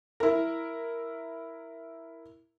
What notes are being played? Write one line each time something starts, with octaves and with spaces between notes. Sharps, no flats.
E4 A#4